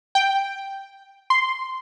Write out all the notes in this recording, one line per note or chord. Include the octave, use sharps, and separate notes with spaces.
G5
C6